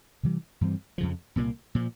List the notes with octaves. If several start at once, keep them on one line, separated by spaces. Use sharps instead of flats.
C3 E3 G3
G2 E3 G3 C4
F2 C#3 F3
C2 A#2 F#3 A#3
A#2 F3